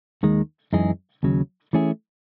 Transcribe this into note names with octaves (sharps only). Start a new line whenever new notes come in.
D#2 D#3 G#3
F#2 E3 G#3 D#4 G#4
D#2 C#3 F#3
E3 A3 C#4 E4 G#4